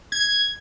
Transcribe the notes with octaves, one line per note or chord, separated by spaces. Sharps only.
G#6